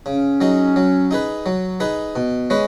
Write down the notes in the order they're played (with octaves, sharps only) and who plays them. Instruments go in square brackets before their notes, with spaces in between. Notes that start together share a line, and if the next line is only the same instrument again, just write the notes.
[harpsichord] C#3 [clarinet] C#4
[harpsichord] F#3 D#4 G#4
F#3
D#4 G#4 B4
F#3
D#4 G#4 B4
B2
G#3 C#4 B4